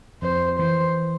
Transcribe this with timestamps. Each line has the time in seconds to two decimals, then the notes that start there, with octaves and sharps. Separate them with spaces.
0.22 F2 C5
0.59 E3 C5